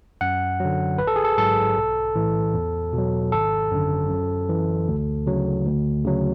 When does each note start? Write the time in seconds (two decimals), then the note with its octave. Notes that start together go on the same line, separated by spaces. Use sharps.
0.21 F#2 F#5
0.60 D3 F#3
0.98 A1 B4
1.07 A4
1.16 G#4
1.25 A4
1.38 G#2 F#3 A4
1.77 B1
2.15 A2 E3
2.54 E2
2.93 B2 F#3
3.32 G#1 A4
3.71 F#2 D3
4.09 F#2
4.49 E3
4.88 D2
5.27 C#3 F#3
5.65 D2
6.05 C#3 F#3